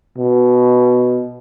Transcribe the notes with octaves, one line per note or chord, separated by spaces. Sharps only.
B2